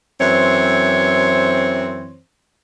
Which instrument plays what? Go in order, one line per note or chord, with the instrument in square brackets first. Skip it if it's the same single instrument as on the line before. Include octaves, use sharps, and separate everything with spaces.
[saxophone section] F#2 E3 C4 C5 C#5